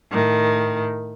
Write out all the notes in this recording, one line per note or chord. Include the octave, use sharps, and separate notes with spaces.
A2 D#3